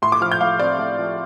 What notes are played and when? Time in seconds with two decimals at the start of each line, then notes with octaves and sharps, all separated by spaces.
0.02 A2 C6
0.12 D6
0.21 F3 F6
0.32 G6
0.41 A2 F5
0.59 C4 D5
0.79 A2
0.99 F3